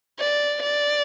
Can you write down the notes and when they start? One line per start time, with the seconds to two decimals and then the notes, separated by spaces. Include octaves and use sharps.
0.19 D5
0.62 D5